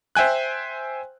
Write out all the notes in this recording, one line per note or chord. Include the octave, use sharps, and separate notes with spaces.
C5 E5 G5 G#5 F#6